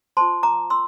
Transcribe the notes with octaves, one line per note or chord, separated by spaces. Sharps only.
F4 C5 A5 C6
A#5 D6
C6 E6